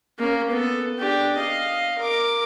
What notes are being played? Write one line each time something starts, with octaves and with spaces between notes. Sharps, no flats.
A#3 C#4
B3 A4
D4 G4
D#5 F5
A#4 D6